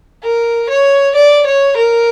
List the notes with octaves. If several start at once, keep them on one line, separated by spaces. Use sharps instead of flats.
A#4
C#5
D5
C#5
A#4